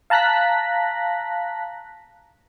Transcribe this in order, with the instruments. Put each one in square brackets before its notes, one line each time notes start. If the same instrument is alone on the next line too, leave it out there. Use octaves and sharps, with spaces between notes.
[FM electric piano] F5 A5 A#5 F#6 A#6 B6